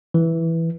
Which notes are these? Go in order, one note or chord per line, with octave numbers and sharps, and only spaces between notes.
E3